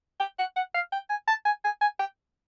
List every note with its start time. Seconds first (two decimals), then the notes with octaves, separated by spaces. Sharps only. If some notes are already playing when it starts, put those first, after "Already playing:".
0.20 G5
0.39 F#5
0.56 F#5
0.74 F5
0.92 G5
1.10 G#5
1.28 A5
1.45 G#5
1.64 G#5
1.81 G#5
1.99 G5